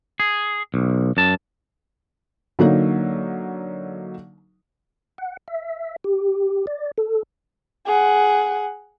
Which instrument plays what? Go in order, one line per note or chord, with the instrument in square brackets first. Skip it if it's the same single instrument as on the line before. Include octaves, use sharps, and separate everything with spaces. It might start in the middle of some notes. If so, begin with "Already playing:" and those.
[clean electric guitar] G#4
B1
F#2 A5
[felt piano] D3 F#3 A#3 D#4
[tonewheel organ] F#5
E5
G4
D5
A4
[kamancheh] G#4 F#5